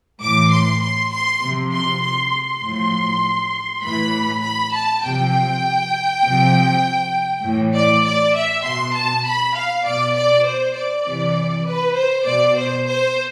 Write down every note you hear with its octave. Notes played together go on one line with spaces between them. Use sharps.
A2 E3 D6
C6
C6
C6
C3 F3
C6
C6
C6
A2 F3
A2 E3 B5
B5
A5
C3 F3 G5
C3 F3
A2 E3
D5
D5
E5
B2 C6
A5
B5
F5
B2 D5
D5
C5
D5
C3 E3
B4
C5
B2 D5
C5
C5